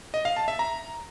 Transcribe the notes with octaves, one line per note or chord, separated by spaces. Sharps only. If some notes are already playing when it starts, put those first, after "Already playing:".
D#5
F5
A5
E5
A#5